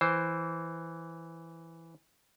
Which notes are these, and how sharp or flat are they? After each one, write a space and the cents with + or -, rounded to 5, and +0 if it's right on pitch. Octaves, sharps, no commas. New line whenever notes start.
E3 +0 C5 +0